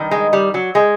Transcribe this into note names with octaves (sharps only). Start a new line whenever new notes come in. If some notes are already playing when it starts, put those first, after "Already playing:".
Already playing: G2 D#3
G#3
G3
F#3
G#3